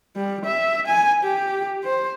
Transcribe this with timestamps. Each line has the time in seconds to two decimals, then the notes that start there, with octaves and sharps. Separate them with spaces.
0.16 G3
0.45 E5
0.87 G#5
1.24 G4
1.84 C5